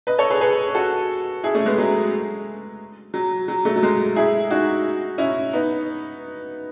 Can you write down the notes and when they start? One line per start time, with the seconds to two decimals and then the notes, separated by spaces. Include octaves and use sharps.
0.07 B4 D#5
0.19 A4 C#5
0.30 G#4 B4
0.41 G#4 B4
0.75 F#4 A4
1.43 E4 G#4
1.55 A3 C#4
1.66 G#3 B3
1.78 F#3 A3
3.14 F#3
3.48 F#3
3.65 F#3 A3
3.76 F#3
3.83 G#3
4.16 E4 G#4
4.50 D#4 F#4
5.18 C#4 E4
5.53 B3 D#4